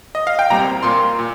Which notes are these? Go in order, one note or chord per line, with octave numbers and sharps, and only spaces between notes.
D#5
F5
G5
C2 A#2 G3 C4 A#5
A#2 A#3 F4 C6
A#2